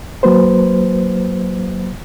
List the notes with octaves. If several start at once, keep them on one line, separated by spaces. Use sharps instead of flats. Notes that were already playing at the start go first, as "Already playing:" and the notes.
F#3 A#3 B4 C5